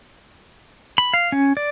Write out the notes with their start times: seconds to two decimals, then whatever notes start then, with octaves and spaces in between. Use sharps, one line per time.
0.98 B5
1.14 F5
1.32 C#4
1.57 D5